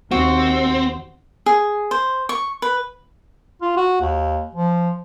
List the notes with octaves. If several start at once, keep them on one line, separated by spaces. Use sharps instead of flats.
D#2 C4 F#4
G#4
C5
C#6
B4
F4
F#4
D#2
F3